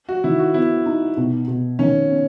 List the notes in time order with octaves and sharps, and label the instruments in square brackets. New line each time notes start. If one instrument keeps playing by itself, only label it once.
[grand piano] F#4
[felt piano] D#3 [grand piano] E4
[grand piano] F#4
[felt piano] B3 [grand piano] E4
[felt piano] D#4
B2
B2
[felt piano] D#3 [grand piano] C#4
[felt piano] C#4